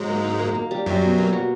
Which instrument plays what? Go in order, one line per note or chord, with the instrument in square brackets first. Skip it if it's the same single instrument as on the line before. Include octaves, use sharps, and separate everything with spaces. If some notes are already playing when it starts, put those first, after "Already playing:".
Already playing: [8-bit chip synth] G#2 G#3 [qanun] F#3 F#4
[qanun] A#3
D#4
A#3
A#3
G3
[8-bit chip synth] F#2 F#3 [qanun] G3
[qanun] B2
A#3
F#4